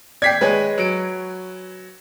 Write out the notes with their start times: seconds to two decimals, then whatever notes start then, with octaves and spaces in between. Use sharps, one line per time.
0.22 D5 G5 G#6 B6 C7
0.41 G#3 B4 C#5 G#5
0.78 F#3 D7